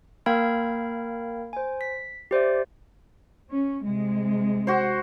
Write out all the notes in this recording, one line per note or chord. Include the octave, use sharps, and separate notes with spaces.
A#3 A#4 F5 G5 B5 G#6
C5 G#5
B6
G4 C5 D5 E5
C#4
C3 G#3
F#4 C5